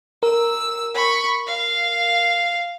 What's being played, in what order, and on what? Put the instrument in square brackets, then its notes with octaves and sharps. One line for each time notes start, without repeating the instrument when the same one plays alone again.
[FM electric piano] A#4 [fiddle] E6
[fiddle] B5 C#6
F5